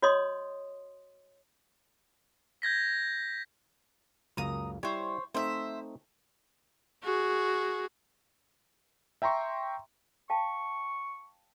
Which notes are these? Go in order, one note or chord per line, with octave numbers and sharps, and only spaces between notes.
F#4 C#5 D#5 C6 D#6
G6 G#6 A#6 B6
C#2 F#2 A#3 A#5 D#6
G3 E4 C5 C#5
A3 C4 D#4 C5 E5
F#4 G#4
E5 G5 A#5 C6 C#6
F5 G5 A5 C#6